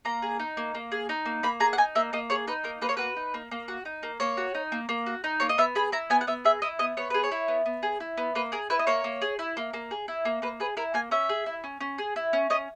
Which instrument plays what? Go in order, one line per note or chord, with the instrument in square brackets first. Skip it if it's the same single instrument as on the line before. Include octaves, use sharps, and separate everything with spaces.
[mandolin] A#3 A#5
G#4
D#4
A#3
A#3
G#4
D#4
A#3
A#3 B5
G#4 A#5
F#5
D#4 G#5
A#3 E5
A#3 D#5
G#4 C#5
D#4 B4
A#3 A#4
A#3 B4
C#5
F#4 B4
D#4
A#3
A#3
F#4
D#4
A#3
A#3 C#5
F#4
D#4
A#3
A#3
F#4
D#4
A#3 C#5
D#5
B3 E5
G#4 B5
E4 A#5
B3 G#5
F#5
B3 E5
G#4 E5
E4 D#5
B3 D#5
B3 C#5
G#4 B4
C#5
E4
B3
B3
G#4
E4
B3
A#3 B4
G#4 A#4
E4 B4
D#5
A#3 C#5
A#3
G#4
E4
A#3
A#3
G#4
E4
A#3
A#3 B4
G#4 B4
E4 A#4
A#3 G#5
C#4 E5
G#4
E4
C#4
C#4
G#4
E4
C#4
C#4 D#5